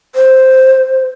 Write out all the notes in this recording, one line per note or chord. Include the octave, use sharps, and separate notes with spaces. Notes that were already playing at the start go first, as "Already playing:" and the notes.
C5